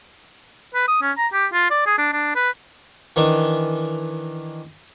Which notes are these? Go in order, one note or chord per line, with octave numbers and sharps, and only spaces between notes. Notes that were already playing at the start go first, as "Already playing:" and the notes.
B4
D#6
C#4
A#5
G4
F4
D5
G#4
D4
D4
B4
D#3 E3 D4